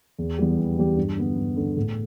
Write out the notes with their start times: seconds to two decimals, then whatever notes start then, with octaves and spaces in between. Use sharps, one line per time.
0.18 E2
0.38 E3 G3 B3 G4
0.58 E2
0.78 E3 G3 B3 G4
0.97 G2
1.17 D3 B3
1.37 G2
1.57 D3 B3
1.77 A2